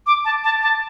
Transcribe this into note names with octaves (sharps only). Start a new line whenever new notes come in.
D6
A5
A5
A5